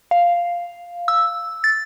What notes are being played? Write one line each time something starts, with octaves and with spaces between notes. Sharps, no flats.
F5
E6
A6